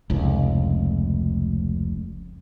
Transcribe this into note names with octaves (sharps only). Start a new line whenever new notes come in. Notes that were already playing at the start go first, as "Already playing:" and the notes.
F1 C#2